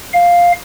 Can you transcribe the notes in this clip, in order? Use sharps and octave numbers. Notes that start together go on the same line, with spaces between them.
F5